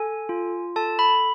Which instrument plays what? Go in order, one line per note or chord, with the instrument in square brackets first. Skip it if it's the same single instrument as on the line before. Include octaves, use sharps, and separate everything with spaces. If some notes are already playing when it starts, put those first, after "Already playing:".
Already playing: [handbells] A4 G#5
F4
A4 A5
B5